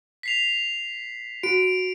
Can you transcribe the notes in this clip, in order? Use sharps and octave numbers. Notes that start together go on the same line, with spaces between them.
B6 C7 F7
F#4 D7